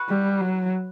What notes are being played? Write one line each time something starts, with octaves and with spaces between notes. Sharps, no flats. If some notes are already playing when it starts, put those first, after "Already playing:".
Already playing: F#4 B4 F#5 C#6
G3
F#3